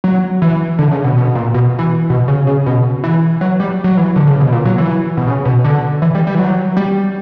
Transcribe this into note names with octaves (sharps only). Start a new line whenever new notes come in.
F#3
E3
D3
C#3
B2
B2
A#2
B2
E3
B2
C#3
C#3
B2
E3
F#3
G3
F#3
E3
D3
C#3
B2
A#2
F#3
E3
B2
C#3
B2
D3
E3
G3
G3
E3
F#3
G3